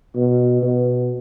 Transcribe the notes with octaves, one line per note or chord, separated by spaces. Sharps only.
B2
B2